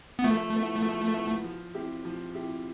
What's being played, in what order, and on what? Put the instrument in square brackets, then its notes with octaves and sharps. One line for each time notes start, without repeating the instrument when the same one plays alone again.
[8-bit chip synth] B3
[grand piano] F3 [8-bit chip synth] A3
[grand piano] B3 E4
F3
B3 E4
F3
C4 E4 G4
F3
C4 E4 G4